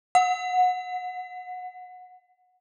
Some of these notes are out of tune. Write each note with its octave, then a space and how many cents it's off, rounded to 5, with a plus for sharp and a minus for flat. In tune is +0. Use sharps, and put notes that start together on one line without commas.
F#5 -20